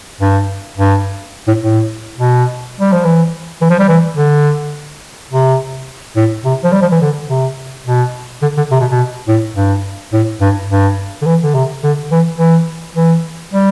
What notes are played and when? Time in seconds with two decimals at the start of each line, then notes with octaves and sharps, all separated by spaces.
0.21 G2
0.78 G2
1.48 A2
1.62 A2
2.18 B2
2.80 G3
2.92 F3
3.05 E3
3.61 E3
3.70 F3
3.79 G3
3.88 E3
4.17 D3
5.31 C3
6.16 A2
6.45 C3
6.64 F3
6.72 G3
6.82 F3
6.92 E3
7.01 D3
7.29 C3
7.86 B2
8.42 D3
8.57 D3
8.71 C3
8.80 B2
8.90 B2
9.28 A2
9.56 G2
10.13 A2
10.41 G2
10.70 G2
11.22 D3
11.26 E3
11.43 D3
11.54 C3
11.83 D3
12.11 E3
12.39 E3
12.96 E3
13.53 G3